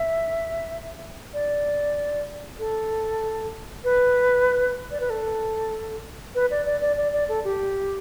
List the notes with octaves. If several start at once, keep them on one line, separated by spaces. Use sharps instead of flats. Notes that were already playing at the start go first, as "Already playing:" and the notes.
Already playing: E5
D5
A4
B4
D5
B4
A4
B4
D5
D5
D5
D5
D5
A4
G4